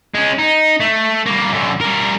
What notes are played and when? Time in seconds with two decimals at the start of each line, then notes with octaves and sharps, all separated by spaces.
0.14 G#3 C#4
0.38 D#4
0.80 A3
1.26 G3 A#3
1.51 F#2 D3
1.81 G3 A#4